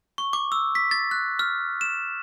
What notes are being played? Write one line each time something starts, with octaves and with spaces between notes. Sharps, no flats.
C#6
D6
E6
B6
A6
F#6
F6
E7